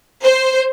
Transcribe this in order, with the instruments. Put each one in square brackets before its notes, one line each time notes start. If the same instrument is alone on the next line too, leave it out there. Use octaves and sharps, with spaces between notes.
[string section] C5